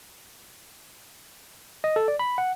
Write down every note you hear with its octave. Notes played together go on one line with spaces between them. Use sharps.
D#5
A4
D5
B5
F#5